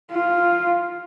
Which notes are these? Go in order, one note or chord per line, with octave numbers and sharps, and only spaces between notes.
F4